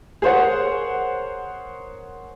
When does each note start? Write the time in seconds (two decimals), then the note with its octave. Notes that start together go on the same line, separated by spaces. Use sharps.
0.22 G#4 A#4 C5 C#5 F#5